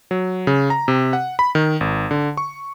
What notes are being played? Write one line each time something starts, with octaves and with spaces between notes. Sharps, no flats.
F#3
C#3
A#5
C3
F#5
B5
D#3
G#1
D3
C#6